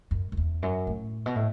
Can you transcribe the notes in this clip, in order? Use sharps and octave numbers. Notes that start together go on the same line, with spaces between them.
F#2
F#2
E2
F#2
A2
B2
A2